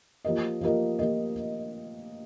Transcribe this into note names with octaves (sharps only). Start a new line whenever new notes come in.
F3 A#3 G4 A#4 D#5
F3 A#3 G4 A#4 D#5
F3 A#3 G4 A#4 D#5